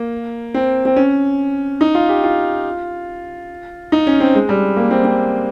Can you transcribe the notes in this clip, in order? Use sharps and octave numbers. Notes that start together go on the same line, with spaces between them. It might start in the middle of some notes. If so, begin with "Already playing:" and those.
Already playing: A#3
C4
C4
C#4
D#4
F4
G4
F4
D#4
C#4
C4
G#3
G3
A#3
C4
C4